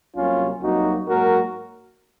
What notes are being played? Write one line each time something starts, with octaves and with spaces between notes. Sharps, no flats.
C2 C3 F#3 A#3 C#4 F4
C2 C3 F#3 A#3 D#4 F#4
G#2 F#3 A#3 F#4 A#4